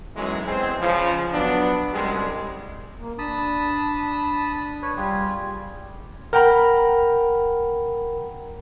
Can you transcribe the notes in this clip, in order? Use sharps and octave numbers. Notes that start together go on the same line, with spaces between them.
B1 F#2 E3 F#3 G#3
E2 G#3 C4 G#4 C5
C#3 F3
F#3 B3 D4
C2 F#2 G3 G#3
A#3
D4 A5 B5 D#6
B4 C#5
G3 F4 G4 G#4
A#4 F#5 G5 A#5 B5